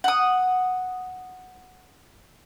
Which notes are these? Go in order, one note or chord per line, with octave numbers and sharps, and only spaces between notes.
F#5 D#6